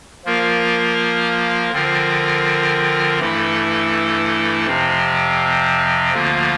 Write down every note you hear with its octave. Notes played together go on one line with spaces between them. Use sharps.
F3 A#3 F4 A#4
D3 F3 C4 F4 A#4
G2 E3 A3 E4 A4
F2 C3 F3 C4
D2 D3 F3 A#3 F4